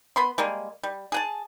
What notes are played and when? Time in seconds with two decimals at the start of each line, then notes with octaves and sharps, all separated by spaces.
0.16 B3 B5 C6
0.38 G3 G#3 A#3
0.83 G3
1.12 G#4 F#5 A5